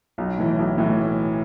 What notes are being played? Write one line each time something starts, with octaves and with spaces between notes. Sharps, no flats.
B1
A2 E3
B1
A2 E3